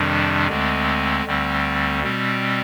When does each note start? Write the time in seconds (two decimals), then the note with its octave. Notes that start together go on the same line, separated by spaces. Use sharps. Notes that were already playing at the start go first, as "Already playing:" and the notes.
Already playing: F2 C3 D#3 G3 D4
0.47 D2 D3 G#3 C4
1.25 D2 D3 G3 C4
2.03 B2 G3 C4